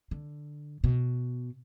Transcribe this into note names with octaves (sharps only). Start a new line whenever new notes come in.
D3
B2